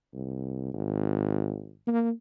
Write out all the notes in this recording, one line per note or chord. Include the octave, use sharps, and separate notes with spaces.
C2
G#1
A#3